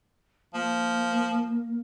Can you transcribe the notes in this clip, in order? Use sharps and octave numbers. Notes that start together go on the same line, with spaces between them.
F3 A#3